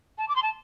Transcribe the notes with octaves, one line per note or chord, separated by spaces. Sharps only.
A5
D6
C6
A5